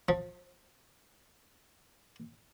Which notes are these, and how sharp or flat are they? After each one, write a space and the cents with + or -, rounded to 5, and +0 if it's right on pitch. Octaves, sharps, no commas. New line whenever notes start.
F3 +25